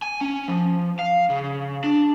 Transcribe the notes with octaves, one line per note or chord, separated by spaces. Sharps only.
G#5
C#4
F3
F5
C#3
D4